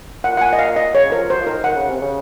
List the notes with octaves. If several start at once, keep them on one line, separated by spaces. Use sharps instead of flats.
A#2 F#5
F#5
G#5
D#5
F5
D#5
C#3 C#5
F3 A#4
F#3 C5
F3
D#3 A#4
D#3 F#5
C#3
C3
C#3